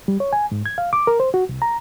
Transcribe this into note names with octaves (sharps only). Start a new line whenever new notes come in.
G3
C#5
G#5
G#2
G#6
F5
D6
A#4
C5
F#4
C2
A#5